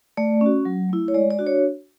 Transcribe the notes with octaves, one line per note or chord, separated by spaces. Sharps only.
A3 D5
C#4 F#4
F#3
A3 E4
C#5
G#3 D5
D5
D4 F#4
C#5